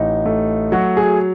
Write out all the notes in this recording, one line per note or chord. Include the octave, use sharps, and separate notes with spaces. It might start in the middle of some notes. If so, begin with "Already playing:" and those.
Already playing: A1 D#4
A3
F#3 F#4
G#4